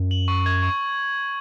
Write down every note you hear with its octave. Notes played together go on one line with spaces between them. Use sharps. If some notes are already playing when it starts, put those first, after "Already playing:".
Already playing: F#2
F#7
C#6
G#6
C#6